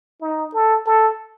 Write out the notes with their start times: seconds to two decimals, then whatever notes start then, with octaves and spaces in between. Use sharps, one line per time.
0.21 D#4
0.54 A4
0.87 A4